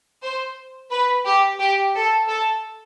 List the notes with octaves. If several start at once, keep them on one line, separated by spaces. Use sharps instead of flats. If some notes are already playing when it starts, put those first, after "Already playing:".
C5
B4
G4
G4
A4
A4